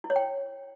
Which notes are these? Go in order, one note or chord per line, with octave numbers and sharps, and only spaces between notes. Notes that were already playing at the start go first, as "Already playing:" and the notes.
E4
C#5
G5